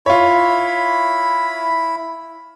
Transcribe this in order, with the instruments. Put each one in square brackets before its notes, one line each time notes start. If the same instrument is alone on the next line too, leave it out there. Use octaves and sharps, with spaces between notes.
[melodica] E4 B5 [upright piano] F4 C#5